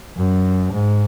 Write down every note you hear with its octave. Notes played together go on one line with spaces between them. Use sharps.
F#2
G#2